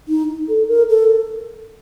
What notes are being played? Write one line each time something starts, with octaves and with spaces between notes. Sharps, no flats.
D#4
A4
A#4
A4